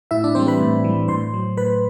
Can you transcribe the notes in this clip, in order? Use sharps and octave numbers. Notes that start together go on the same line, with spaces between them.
A2 E4 E5
D4 D5
E3 G3 C4 C5
B4 B5
A2
E3 G3
A2 C5 C6
F#3
A2 B4 B5